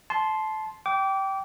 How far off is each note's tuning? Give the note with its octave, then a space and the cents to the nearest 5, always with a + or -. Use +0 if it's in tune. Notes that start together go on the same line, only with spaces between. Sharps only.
A5 -20 C6 +0
G5 -15 D6 -25